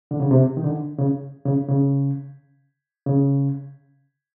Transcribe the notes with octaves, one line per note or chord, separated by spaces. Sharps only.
D3
C#3
C3
D#3
D3
C#3
C#3
C#3
C#3